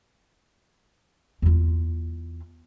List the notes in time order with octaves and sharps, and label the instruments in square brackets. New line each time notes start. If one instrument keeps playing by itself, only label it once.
[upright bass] E2 F4